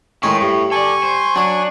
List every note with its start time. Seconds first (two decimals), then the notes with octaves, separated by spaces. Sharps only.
0.23 A2 D#3 G#3 C#4
0.41 G2
0.71 A4 D5 G#5 C#6
1.03 C5
1.36 F#3 D4 D#6